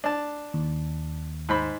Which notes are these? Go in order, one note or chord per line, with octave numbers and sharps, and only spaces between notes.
D4 A5
D#2
G#2 C5 B5